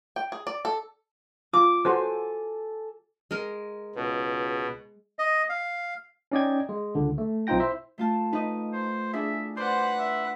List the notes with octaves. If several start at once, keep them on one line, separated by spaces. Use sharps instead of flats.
G5
G#4
D5
A4
F4 D6
F#4 A4 C5 G#5
G#3 A#4
C#2 B2
D#5
F5
C#4 D#4 D5 D#5 G5 G#6
G#3
C#2 D3
A3
B1 C4 D#4 F4 G5 A#6
E4 C5 E5
A3 F4 A5
D#4 B4 D#5
C5
D4 E4 G#4 E5
B4 C5 D5 F#5 C6
E5